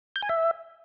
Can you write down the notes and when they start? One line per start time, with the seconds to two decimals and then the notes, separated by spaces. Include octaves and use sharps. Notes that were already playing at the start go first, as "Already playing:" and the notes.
0.16 G6
0.22 G#5
0.29 E5